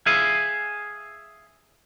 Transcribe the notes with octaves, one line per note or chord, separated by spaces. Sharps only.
G#4 E5 F5 G#5